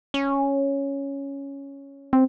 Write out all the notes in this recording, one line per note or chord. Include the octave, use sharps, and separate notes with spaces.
C#4
C4